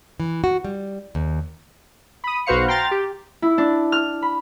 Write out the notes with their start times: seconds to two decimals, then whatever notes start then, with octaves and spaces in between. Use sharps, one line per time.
0.20 E3
0.44 F#4
0.65 G3
1.15 D#2
2.24 B5 D#6
2.46 B1 F#4 B4 C5 F5 C#7
2.68 G5 A#5 C6 F6 A6
2.91 G4
3.42 E4
3.58 D4
3.92 F6
4.22 B5